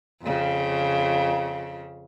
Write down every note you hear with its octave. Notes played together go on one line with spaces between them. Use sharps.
F2 C#3